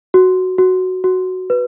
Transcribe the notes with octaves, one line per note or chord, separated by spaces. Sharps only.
F#4
F#4
F#4
B4